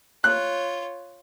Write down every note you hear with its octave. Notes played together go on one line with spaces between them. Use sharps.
F4 C#5 F#6